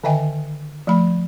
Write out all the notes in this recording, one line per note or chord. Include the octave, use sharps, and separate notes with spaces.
D3 D#3 D#5 E5 G5 G#5
F3 A3 B5